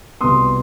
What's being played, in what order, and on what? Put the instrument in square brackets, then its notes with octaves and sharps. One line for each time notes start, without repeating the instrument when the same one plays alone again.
[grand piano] C2 B2 B3 C6 D#6